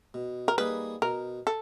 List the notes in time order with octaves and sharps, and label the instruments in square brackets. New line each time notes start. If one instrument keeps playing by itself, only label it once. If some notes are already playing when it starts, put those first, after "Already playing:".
[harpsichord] B2
[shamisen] A#4
[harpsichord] G3 A#3 D#4 G#4 [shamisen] B4
[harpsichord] B2 [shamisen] A#4
[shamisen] A4